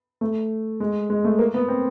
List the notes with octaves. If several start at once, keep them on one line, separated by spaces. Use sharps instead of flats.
A3
G#3
G#3
A3
A#3
B3
C4